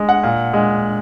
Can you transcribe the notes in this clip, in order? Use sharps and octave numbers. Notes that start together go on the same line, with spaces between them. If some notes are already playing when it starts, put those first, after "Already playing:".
Already playing: G#3
F#5
A#2
G#3